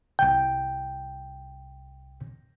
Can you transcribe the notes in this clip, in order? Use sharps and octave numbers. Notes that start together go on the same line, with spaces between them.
C2 G5